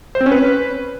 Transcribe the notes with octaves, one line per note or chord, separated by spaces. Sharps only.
C5
C4
C#4
B4